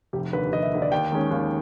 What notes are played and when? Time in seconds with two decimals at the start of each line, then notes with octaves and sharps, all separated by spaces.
0.13 F1 G4
0.33 D#2 D3 B4
0.52 F1 D#5
0.62 E5
0.73 D#2 D3
0.82 D5
0.92 D#2 G5
1.12 D#3 G#3 C#4
1.31 D#2